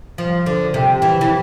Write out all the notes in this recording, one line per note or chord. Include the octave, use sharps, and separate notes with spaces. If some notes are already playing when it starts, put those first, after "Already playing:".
F3
D3
C3
E3
E3